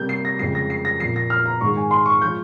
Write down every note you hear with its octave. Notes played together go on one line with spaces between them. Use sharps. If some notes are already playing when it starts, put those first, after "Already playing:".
Already playing: C3 G3 A#3 G6
C7
A#6
F2 C#3 G#3 C7
A#6
C7
A#6
A#2 F3 A#3 C7
A#6
F6
A#5
G#2 D#3 G#3 C#6
G#5
C6
C#6
F3 G#3 G6